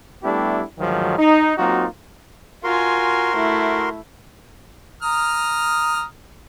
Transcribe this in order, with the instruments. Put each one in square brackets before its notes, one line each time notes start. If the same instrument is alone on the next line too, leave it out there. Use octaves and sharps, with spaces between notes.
[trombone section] G3 A3 B3 D4 E4 G4
D2 G#2 D#3 F3 F#3
D#4
F#3 A#3 C4 D#4 F4 F#4
[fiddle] F4 G#5 [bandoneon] F#4 A#4 C6
[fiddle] A3 E4
[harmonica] A#5 D#6 F6